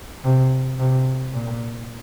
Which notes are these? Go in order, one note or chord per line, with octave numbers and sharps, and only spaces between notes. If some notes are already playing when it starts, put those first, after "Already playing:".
C3
C3
A#2